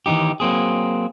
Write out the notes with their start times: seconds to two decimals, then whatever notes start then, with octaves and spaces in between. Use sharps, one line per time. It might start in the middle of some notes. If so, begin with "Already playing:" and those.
0.06 D#3 E3 F#3 D#4 G4
0.40 F#3 A#3 C4 G#4